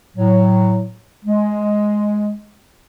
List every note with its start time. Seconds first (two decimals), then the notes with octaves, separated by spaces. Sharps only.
0.17 A2 F#3
1.25 G#3